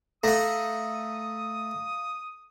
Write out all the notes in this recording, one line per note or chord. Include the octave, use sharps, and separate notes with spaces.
A3 A4 F5 F#5 A#5 D#6 A#6